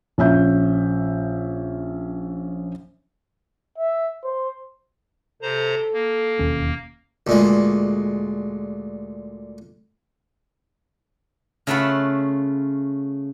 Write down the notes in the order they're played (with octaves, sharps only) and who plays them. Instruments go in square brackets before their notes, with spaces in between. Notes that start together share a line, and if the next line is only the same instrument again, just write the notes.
[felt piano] A#1 C#4 E5 G6
[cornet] E5
C5
[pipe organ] C3 C5 A#5 [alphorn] A4
[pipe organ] A#3
[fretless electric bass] E1 D#2 C#4
[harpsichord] D2 A#2 G#3
[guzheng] C#3 A3 F4 E5 F#5 B5